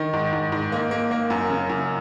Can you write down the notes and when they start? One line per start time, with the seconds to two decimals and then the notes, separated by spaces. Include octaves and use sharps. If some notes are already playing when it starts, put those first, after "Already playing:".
Already playing: D#3
0.13 G#2
0.32 G#2
0.52 G#2
0.72 A#3
0.91 A#3
1.11 A#3
1.30 F#2
1.50 C#3
1.70 F#2